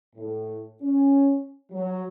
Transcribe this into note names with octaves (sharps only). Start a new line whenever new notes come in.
A2
C#4
F#3